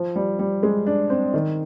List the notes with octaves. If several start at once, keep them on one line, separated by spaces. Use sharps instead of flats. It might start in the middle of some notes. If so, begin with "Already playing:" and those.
Already playing: F3
G3
G3
G#3
D4
C4
D#3